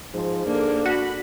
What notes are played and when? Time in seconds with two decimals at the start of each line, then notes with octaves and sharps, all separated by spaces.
0.14 G#2 F3
0.46 A#3 D4 A4
0.86 F#4 B5